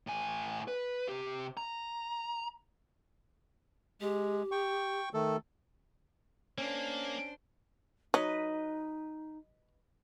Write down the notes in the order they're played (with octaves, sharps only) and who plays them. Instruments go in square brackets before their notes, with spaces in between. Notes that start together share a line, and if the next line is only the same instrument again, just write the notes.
[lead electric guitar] A2 G#5
B4
C3 G4
A#5
[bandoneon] G#3 [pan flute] G4
[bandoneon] G5 C#6
D#3 A3 A4
[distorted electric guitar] A#3 [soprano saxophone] C#4 [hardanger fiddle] D4 C5
[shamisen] F#3 [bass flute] D#4 [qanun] B4 D#5